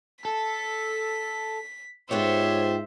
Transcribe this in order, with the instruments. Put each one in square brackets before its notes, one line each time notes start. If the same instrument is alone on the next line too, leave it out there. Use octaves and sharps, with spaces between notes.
[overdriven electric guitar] A4 [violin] B6
[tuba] G#2 [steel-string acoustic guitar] B3 F4 G4 [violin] C5 E5 [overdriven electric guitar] C#5